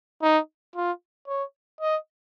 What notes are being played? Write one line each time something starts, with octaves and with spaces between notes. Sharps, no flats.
D#4
F4
C#5
D#5